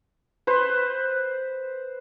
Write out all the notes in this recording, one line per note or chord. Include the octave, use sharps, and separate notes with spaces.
B4 C5